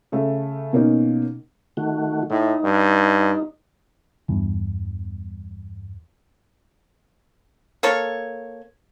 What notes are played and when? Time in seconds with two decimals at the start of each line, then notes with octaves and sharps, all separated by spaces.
0.12 C#3 A3 A4
0.73 B2 A#3 C#4 D#4
1.77 D#3 A3 F#4
2.30 A2 D#4
2.64 G2
4.28 E2 G2
7.83 A#3 A4 C#5